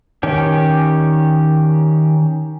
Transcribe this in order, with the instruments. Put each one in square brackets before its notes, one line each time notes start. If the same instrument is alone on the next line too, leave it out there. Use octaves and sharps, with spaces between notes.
[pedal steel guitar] D#3 C#4 G4